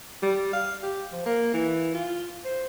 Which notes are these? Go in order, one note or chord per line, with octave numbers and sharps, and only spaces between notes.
G3
F5
G4
F3
A#3
E3
F4
C5